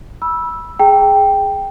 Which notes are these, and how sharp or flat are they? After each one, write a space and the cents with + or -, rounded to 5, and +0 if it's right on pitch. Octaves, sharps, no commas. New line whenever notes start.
B5 -25 E6 +0
G#4 +0 G5 +0 A#5 -35